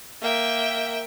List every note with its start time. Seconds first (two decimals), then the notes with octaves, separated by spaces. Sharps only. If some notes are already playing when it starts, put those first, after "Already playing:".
0.22 A#3 E5 G5